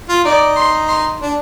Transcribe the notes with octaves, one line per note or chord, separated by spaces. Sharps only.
F4
D#4 D5
C6
C6
D4